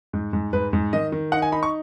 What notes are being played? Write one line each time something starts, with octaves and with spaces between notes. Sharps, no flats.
G#2
G#2
G#2 B4
G#2
D#3 D#5
D#3
D#4 F#5
G#5
D#4 B5
C#6